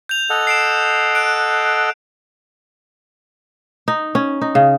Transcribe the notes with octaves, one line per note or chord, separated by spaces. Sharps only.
G6 F7
A4 D#5 F#5
C7 D7 E7
F#6 D7
D#4
C#4
D#4
C#3